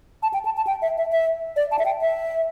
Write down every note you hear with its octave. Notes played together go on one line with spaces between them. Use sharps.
A5
G5
A5
A5
G5
E5
E5
E5
D5
A5
E5
G5
E5